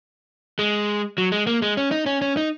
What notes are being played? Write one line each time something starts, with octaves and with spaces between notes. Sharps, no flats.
G#3
F#3
G#3
A#3
G#3
C#4
D#4
C#4
C#4
D#4